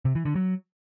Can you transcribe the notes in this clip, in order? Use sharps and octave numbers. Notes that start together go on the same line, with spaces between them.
C3
E3
D3
F#3